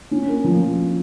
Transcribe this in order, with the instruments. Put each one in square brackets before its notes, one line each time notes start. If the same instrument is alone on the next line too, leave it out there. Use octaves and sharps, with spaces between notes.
[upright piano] C#4
A#3
F3